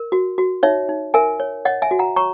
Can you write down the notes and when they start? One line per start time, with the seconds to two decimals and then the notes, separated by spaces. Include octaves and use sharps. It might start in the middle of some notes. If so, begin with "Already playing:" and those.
Already playing: A#4
0.12 F#4
0.38 F#4
0.63 D#4 C#5 E5
0.89 D#4
1.14 A#4 E5 G#5
1.40 C#5
1.65 C#5 D#5 F#5
1.82 E5 G#5
1.91 F#4
1.99 F#5 A#5
2.16 C#5 A#5 C#6